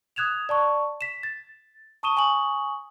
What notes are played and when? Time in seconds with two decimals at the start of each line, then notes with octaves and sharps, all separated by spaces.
0.16 D#6 F#6 G#6 E7 F7
0.49 D5 A5 C#6
1.01 B6 E7
1.23 A6
2.03 A5 C#6 D#6 D#7 E7 G7
2.17 G#5 C#6 D#6 F#7